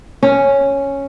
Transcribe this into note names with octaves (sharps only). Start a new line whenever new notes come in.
C#4